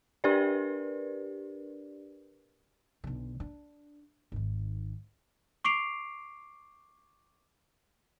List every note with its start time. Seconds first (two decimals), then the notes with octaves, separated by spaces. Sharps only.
0.24 D4 G4 A#4 B4 D5
3.04 B1 D3
3.40 D4
4.32 G#1 D#3
5.64 C#6 D6 C7 D7 F7